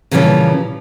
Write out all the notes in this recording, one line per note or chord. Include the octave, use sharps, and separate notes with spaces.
A#2 C#3 E3 F3 G3 C#4